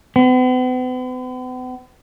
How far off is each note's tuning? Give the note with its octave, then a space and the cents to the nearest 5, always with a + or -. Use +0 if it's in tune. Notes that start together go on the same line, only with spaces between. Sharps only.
B3 +45